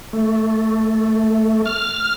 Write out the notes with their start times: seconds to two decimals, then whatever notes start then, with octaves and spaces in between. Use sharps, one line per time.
0.13 A3
1.66 F6